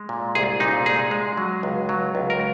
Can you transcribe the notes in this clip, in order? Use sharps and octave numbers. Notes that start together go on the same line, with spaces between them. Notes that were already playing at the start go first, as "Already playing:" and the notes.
Already playing: G#3
A#2
C2 G#4
A#2 D#4
G#3 G#4
G#3
F#3
C#2
F#3
C#2
A#4